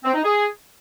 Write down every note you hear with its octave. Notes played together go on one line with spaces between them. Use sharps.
C4
D#4
G#4